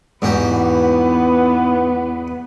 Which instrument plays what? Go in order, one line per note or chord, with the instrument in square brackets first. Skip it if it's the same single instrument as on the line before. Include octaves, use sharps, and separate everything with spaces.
[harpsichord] E2 F#4 G4 [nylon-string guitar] G#2 E3 [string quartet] B3